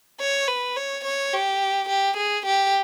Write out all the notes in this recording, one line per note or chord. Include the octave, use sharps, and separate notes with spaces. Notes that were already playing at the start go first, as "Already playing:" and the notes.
C#5
B4
C#5
C#5
G4
G4
G#4
G4